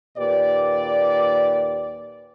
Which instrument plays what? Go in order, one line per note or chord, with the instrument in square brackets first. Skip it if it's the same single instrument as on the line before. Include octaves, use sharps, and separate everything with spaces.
[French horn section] D#2 A#2 G4 B4 D5